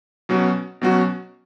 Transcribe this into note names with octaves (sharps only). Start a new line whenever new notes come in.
B2 F#3 C#4 F#4
B2 F#3 C#4 F#4